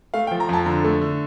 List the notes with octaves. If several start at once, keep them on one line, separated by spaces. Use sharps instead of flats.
A3 F5
G5
F3
A#5
F2 A5
D3 A#5
A3
D3